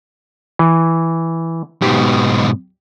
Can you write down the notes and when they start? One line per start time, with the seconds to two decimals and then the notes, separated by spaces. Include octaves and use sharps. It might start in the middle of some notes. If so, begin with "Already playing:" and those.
0.59 E3
1.82 G#2 B2 G4